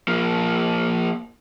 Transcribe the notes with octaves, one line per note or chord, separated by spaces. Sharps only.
F3 A#3